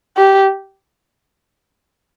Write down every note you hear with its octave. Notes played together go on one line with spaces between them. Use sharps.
G4